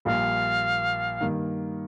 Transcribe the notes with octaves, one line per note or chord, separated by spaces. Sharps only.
A#1 A#2 G3 A#3 F5
G2 D#3 A#3